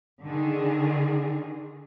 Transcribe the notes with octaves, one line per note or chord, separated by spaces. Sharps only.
D3 D#3 G#4